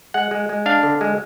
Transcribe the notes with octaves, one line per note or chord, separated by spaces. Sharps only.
G#3 F#5
G#3
G#3
D4 F5
D3
G#3